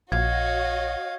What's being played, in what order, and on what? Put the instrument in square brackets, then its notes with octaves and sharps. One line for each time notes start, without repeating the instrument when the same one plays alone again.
[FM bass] A#1 [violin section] F#4 C#5 D#5 [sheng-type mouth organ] F5 [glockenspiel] G#6